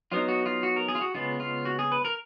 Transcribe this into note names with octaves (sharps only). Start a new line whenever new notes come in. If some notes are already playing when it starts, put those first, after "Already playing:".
F#3 B3 D#4 F4
F#4
F4
F#4
A#4
G#4
F4
F#4
C#3 G#3 B3 F4
F4
F#4
G#4
B4
A#4